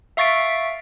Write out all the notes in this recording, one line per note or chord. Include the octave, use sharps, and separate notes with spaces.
E5 F5 C#6 A6 B6 D7